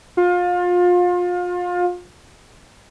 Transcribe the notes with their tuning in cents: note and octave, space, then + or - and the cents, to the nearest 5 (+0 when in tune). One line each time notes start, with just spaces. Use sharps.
F4 +30